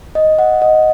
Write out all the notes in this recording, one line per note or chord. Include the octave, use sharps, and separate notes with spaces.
D#5
F#5
D#5